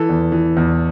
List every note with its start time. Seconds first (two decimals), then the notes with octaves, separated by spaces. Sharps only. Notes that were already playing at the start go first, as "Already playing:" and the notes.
Already playing: E3 A4
0.09 E2
0.32 E3
0.57 E2